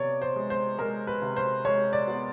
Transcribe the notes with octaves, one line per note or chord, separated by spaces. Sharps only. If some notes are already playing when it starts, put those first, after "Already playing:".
Already playing: C3 B3 C#5 D5
C5
G#3
C5
G#3 A#4
B4
C3
C5
G#3 C#5
D5
B3